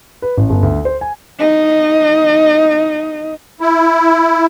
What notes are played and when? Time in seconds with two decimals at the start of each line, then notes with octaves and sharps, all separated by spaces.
0.22 B4
0.37 A1
0.50 G1
0.63 D2
0.85 C5
1.01 G#5
1.39 D#4 D#5
3.61 E4